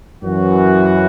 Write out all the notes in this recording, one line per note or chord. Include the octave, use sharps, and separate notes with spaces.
F#2 E3 F#4